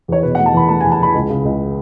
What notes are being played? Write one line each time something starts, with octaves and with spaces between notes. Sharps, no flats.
E2 C#5
B2 B4
F#5
A3
A5
E2 B5
A3 A5
G#5
E2
A5
E2 B5
C#2
C#3
C#2